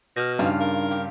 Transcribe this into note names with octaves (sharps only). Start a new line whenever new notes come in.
B2 F6 A#6
G2 C#3 D4 D#4 F4 G4
A#4
G4